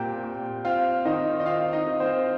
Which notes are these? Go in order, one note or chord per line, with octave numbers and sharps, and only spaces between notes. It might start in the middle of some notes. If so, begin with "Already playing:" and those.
Already playing: A#2 G3 C4 G4 A#4 G5
A#2
C4 F4 F5
D#3 D#4 D#5
D#5
C4 F4 F5
D#4 D#5
D#3
C4 C5